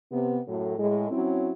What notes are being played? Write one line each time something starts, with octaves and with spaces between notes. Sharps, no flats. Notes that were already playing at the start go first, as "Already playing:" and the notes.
C3 B3
F#2 A2
A2 G#3
F#3 C4 C#4 E4